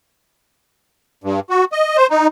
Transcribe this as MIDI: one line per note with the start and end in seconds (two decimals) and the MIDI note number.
1.24 1.40 43
1.50 1.65 66
1.72 1.97 75
1.97 2.07 72
2.10 2.27 63